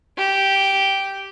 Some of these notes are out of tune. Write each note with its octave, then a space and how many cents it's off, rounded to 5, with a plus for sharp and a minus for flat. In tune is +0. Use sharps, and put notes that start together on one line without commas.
G4 -5